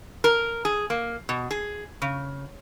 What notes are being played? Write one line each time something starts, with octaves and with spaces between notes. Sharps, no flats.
A#4
G#4
A#3
B2
G#4
C#3